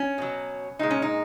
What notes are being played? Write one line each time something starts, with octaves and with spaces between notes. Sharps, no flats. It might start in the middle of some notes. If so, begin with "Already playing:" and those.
Already playing: C#4
B2 F#3
A#2 G#3 D#4
C#4
D#4